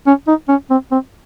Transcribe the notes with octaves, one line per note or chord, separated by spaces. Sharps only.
C#4
D#4
C#4
C4
C4